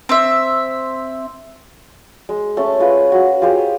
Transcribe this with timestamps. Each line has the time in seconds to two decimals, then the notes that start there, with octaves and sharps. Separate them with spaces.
0.09 C4 E5
2.29 G#3
2.57 A3 C#4 A5
2.80 G#3 F4 B4
3.12 F#4 D#6
3.42 F4 G4 G#4 C5